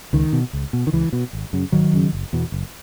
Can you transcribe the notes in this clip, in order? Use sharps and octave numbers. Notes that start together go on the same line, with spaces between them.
C#2 D#3
B2
C#2
B2
D#3
C#2 E3
B2
G#1
F#2 C#3
G#1 D#3 F#3
F#2 C#3
F#1
E2 B2
F#1